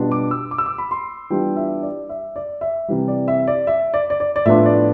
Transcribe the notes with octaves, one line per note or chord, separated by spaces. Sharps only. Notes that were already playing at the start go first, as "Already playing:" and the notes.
Already playing: B2 G3 B3 D4 F4
D6
E6
D6
E6
D6
B5
C6
E3 G3 B3 D4 F4 G5
E5
D5
E5
D5
E5
C3 E3 G3
D5
E5
D5
E5
D5
D5
D5
D5
A2 F3 B3 D4 F4 E5
D5